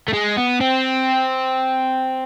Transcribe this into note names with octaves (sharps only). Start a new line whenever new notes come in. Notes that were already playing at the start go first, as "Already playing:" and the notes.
A3
G#3
B3
C4